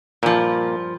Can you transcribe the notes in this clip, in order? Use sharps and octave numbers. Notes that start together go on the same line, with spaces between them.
G2 A#2 F3